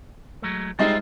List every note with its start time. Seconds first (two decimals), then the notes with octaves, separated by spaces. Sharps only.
0.42 F#3 G#3 A3
0.79 G3 G#3 D#4 F4 C5 E5